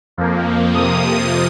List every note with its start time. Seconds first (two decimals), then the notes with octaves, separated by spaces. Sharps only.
0.18 F2 F3 A#3
0.74 F2 C3 F3 A#3 D#6